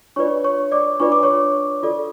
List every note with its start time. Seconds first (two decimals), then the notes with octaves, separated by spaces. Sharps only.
0.16 D4 F4 B4 C#5 D5 C#6
0.44 C#5 C#6
0.72 D5 D6
1.00 D4 F4 B4 D5 C#6
1.12 D6
1.23 C#5 C#6
1.83 F4 A4 D5